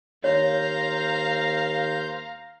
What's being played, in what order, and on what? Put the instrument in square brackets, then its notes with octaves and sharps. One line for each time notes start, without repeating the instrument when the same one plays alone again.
[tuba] D#2 [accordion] C5 G6 [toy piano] C#5 [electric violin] F5 A#5